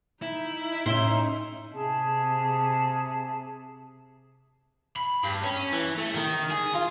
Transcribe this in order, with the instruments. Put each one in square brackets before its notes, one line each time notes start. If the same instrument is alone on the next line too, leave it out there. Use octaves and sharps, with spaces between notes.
[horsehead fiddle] D#4 [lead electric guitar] E4
[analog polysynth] A2 E5 [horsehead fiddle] C#4 D#4 [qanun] C6
[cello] C3 [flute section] G#4 E5 A5
[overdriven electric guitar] B5
G2
C#4
E3
A3
D#3
G#4
F4